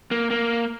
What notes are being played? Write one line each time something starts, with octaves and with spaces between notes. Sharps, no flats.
A#3
A#3